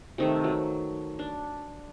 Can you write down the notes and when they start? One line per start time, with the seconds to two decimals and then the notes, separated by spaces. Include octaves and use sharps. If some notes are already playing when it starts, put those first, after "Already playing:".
0.18 C3 D#3 A3
0.44 F#3
1.19 D4